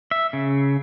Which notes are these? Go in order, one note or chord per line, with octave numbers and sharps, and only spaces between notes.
E5
C#3